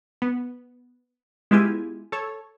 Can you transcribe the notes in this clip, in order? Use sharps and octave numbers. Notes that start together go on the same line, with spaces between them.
B3
G#3 B3 E4 F4 G4 G#5
A4 C#5